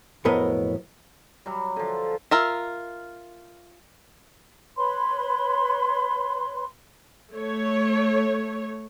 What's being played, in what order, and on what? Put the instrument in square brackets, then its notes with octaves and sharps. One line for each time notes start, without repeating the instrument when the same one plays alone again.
[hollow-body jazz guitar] B1 F2 A2 B3 A#4 D#5
[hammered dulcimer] F#3 G3
D3 F3
[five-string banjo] F4 A#4 E5
[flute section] B4 C#5 B5 C6
[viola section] A3 C#5